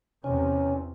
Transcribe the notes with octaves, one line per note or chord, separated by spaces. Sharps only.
E2 C3 C#4